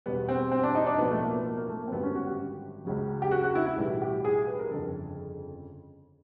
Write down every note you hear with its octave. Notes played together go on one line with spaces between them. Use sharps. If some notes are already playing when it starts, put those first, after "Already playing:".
E2 B2 G3 B3
C4
C4
D4
D#4
D4
B1 A2 F3 B3
A3
A#3
B3
A#3
A#3
A3
A#3
C4
G#1 F#2 D3 G3 B3
C#4
F#4
G4
C#2 C#3 F#3
G4
F#4
F#4
E4
E4
B1 A2 E3 G3
G4
G#4
B4
A#4
G1 F2 C#3 A4